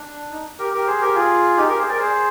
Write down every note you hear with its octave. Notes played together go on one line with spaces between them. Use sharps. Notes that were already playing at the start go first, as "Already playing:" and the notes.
Already playing: D4
D#4
G4 A#4
G4 A#4
G#4 C5
G4 A#4
F4 G#4
D#4 G4
G4 A#4
G#4 C5
A#4 D5
G#4 C5